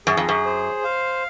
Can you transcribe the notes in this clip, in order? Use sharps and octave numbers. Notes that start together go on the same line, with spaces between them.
F#2 G#4
F2
F#2
C5
F5